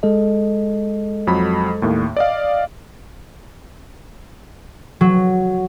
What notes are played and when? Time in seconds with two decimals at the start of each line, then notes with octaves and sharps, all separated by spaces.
0.03 G#3 A4 D#5
1.27 F2 F#3 B5
1.82 D#2 A2 A#3
2.17 D5 D#5 F5
5.01 F#3